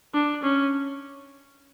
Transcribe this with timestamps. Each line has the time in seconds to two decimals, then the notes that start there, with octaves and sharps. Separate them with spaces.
0.14 D4
0.43 C#4